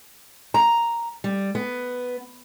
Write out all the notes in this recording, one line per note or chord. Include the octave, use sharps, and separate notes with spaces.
A#5
G3
B3